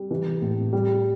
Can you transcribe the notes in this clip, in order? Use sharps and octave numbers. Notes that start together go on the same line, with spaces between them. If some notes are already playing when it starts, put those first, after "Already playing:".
Already playing: G3
E3
A2
G3